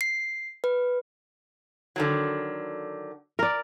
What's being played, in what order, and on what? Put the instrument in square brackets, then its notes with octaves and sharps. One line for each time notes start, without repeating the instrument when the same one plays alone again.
[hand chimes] C7
B4
[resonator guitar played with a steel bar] D3 D#3 F#3
[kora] A#4 D5